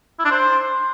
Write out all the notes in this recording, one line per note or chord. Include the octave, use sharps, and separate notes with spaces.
E4
D4
C5